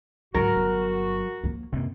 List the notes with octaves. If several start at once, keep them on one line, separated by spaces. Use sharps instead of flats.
G#2 D3 F#3 F#4 A#4
G1
F3 A#3
F#2 C3 A#3